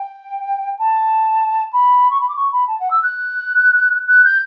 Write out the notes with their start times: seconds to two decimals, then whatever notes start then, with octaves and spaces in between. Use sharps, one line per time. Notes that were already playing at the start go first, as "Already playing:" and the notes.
Already playing: G5
0.79 A5
1.73 B5
2.11 C#6
2.21 B5
2.29 D6
2.36 C#6
2.52 B5
2.68 A5
2.80 F#5
2.91 E6
3.03 F#6
4.08 F#6
4.24 G6